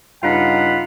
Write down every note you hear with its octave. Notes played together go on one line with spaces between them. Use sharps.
G2 C#3 D#4 F4 F#5 B5